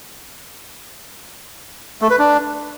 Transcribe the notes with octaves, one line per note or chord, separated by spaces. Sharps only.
A3
B4
D4